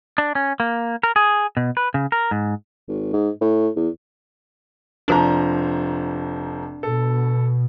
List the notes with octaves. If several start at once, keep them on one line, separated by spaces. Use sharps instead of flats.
D4
C#4
A#3
A#4
G#4
B2
B4
C#3
A#4
G#2
G#1
G#2
A2
E2
F1 F3 D4 A#5
B2 A4